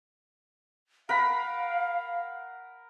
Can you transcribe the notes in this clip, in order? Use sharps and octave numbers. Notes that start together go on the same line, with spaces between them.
A#4 F5 F#5 B5